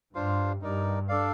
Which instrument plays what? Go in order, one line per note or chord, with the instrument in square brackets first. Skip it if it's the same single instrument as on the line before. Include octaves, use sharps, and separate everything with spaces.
[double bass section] G2 [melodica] D4 F4 C5 F5
[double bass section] G2 [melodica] D#4 A#4 D5
[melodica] D4 A4 D5 F5